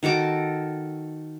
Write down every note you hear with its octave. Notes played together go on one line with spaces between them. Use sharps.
D#3 F#4 A4 D6